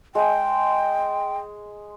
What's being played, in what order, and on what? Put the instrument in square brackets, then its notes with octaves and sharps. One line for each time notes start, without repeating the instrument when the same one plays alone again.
[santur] G#3 [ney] G5